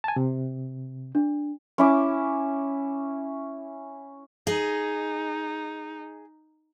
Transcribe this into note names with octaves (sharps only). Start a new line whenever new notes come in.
G#5 A5
C3
D4
C#4 E4 D6
D#4 G#4 D#5